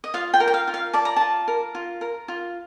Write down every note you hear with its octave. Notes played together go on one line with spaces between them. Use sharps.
D#5
F4 F5
G5
A#4
G5
F5
F4
F5
D5 A5
A#5
F4 A5
A#4
F4
A#4
F4